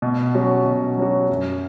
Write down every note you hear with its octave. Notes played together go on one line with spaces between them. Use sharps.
B2
F#3 C#4 F#4
B2
F#3 C#4 F#4
F#2